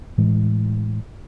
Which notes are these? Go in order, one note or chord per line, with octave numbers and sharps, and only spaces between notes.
A2 E3 G#3